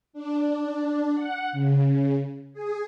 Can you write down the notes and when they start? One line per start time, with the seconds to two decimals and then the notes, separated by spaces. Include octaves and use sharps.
0.13 D4
1.15 F#5
1.52 C#3
2.53 G#4